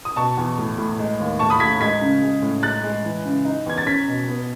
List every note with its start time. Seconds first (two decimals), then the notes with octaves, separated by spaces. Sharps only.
0.05 D#6
0.16 B2 A5 C#6
0.37 E2
0.58 A2
0.78 A2
0.99 G#3
1.20 D#2
1.39 A2 A5 C#6
1.50 B5 D#6
1.60 A2 G#6 B6
1.81 G#3 G#6 B6
2.01 C#3
2.23 G#3
2.42 A2
2.63 G#3 F#6 A6
2.83 G#3
3.05 E3
3.25 C#3
3.45 D#4
3.66 E2 G#6
3.78 A6
3.87 C#4 G#6 B6
4.08 B2
4.28 B3